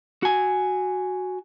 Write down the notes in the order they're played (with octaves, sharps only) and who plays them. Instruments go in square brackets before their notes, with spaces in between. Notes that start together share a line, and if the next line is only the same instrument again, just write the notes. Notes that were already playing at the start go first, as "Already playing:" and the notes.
[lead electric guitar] F#4 G#5